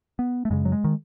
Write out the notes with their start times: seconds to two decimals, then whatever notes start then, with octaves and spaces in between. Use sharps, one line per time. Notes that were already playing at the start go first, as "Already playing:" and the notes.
0.19 B3
0.45 A3
0.50 F#2 C#3 G#3
0.65 F#3
0.72 G#3
0.84 D#3